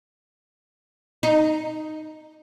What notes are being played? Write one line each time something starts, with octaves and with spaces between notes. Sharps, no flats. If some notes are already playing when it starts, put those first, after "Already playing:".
D#4